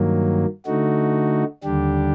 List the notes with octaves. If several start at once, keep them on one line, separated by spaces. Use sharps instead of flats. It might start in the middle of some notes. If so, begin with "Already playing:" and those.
Already playing: G2 D#3 F#3 A#3
D3 A3 D#4 F#4
D#2 D3 G3 D4 G4